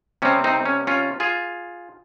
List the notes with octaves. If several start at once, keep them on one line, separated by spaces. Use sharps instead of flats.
C3 G3 C4 C#4
C4 D#4
C#4
C#4 F4
F4 G#4